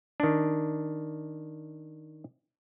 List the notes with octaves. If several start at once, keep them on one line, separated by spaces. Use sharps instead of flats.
D#3 D4